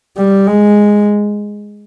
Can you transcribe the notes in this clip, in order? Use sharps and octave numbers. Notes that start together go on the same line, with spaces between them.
G3
G#3